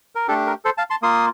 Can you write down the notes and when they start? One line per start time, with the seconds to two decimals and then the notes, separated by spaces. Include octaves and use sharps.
0.15 A#4
0.28 A3 D4 G4 A4
0.47 A#4
0.65 A4 C5
0.78 F5 A5
0.90 A5 C6
1.02 A#3 F4 C6 D#6